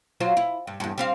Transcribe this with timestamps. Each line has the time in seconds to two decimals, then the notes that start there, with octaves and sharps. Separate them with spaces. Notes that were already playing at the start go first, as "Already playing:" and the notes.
0.20 F#3 F4 C5
0.37 E4
0.67 G2
0.80 E2 G2
0.98 G3 C4 F5